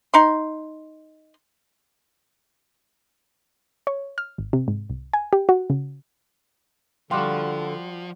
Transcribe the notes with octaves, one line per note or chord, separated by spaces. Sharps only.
D#4 C6
C#5
F6
G#1
C3
G#2
C2
G#5
G4
F#4
C#3
D3 F3 G3 F#4 F5 G5 C6 D6